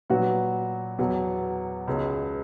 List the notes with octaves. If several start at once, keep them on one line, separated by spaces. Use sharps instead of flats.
A#2 F#3 B3 F#4
E2 B2 F#3
C#2 B2 G#3 C#4